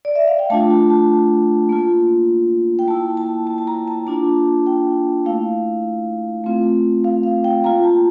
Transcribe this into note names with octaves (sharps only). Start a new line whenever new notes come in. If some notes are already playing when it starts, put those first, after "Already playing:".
D5
E5
F5
G5
A3 D4 F4 A5
A5
A5
A#3 F4
G5
A#3 E4 A5
A5
A5
A5
A#5
A5
A#3 D4 F4 A5
G5
A3 E4 F5
A3 C4 F4
F5
F5
G5
A#3 F4 A#5
A5